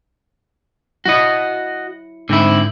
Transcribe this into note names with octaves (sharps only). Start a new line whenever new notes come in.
F#3 E4 F#4 D#5 C#7
G#2 D3 C4 E4